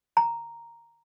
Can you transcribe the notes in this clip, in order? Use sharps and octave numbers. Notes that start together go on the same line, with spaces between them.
A#5